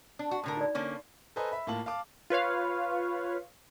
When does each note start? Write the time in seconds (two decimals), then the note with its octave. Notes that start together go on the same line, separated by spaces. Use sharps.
0.19 D4
0.31 F#4
0.44 A2 D3 A#4
0.57 D#4 D5
0.75 D3 A#3 C#4
1.36 A4 B4 C5 D#5 G#5 A#5
1.52 E5 B5
1.67 A2 A#3 F4 A5 F#7
1.86 F5 A5 D6
2.30 F4 B4 C#5 F5